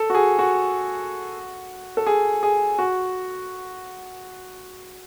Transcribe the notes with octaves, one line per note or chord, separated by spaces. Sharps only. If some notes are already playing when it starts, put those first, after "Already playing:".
Already playing: A4
F#4
G#4
F#4
A4
G#4
G#4
F#4